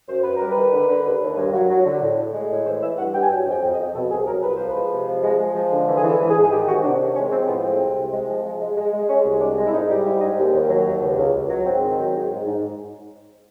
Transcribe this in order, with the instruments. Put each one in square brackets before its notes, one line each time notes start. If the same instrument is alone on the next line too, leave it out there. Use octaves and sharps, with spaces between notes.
[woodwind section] F#2 C5
F#2 B4
G3 A#4
B4
D#3
D3
D3
D#2
D#2
G2
F#3
F#3
D3
A2
A2
G#3
A2
E3 C5
E3 E5
G2 F#5
G2 G5
G#5
F#3 G5
F2
G5
F2
D#5
F2
B2 A4
C2 G#4
F#3 A#4
C2 B4
F3 C5
B4
G#3
C3
F3
G#3
G#3
F3
D3
E3
G#4
E3
A4
G#2
G#4
G#2
G#4
D#3 G4
C3 F#4
C3 D4
D#3 C#4
G#3 C#4
F3 C4
A2 B3
G#3 C4
C2
C3
G#3
F3
G#3
G#3
G#3
G#3
G#3 C#4
C2
G#3 D4
G#3
E4
G#2 D#4
G3
G#2 E4
G#2 D#4
D#2
D#2
F#3
D#2
C#2
C#2
C#2
F#3
G#2 C4
D#3
F#3
G#2
G#2
G#2